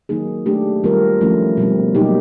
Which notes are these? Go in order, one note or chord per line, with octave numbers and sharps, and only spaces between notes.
D#3 F#3 A#3 D#4 G#4
A3 D4 G4
D#3 G3 C4 F4 A#4
F3 A3 C#4 E4
B2 G3 C4
B2 F#3 A#3 D#4 G4